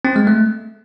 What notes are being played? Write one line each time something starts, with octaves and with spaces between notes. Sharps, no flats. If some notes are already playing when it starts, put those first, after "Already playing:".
C4
G#3
A3